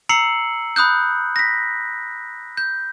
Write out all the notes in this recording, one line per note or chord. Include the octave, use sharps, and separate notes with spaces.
A#5 E6 C7 C#7 F#7
B5 D#6 F#6 G6
A#6 B6
G6